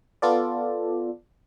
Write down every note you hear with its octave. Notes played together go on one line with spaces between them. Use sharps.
B3 F4 A4 D5